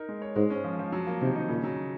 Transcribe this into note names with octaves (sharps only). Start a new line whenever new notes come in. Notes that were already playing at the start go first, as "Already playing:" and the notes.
Already playing: D#4 A#4
G#3
C#5
G#2 G#3
C#4
F3
F3
F#3
A#3
C3 D#3
D#4
A#2 C#3
F#3